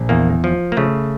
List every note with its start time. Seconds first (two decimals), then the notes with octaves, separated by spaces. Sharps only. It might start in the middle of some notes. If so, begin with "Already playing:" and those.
Already playing: A#1
0.09 E2 A#3
0.44 F3
0.72 A#3
0.77 C#3 A3